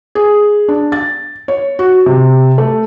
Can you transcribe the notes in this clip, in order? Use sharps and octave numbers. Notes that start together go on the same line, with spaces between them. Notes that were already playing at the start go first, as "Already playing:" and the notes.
G#4
D4
A6
C#5
F#4
C3
A3